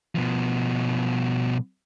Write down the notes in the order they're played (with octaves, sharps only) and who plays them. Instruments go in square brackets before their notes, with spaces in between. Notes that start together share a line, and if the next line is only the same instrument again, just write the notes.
[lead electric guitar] B2 F3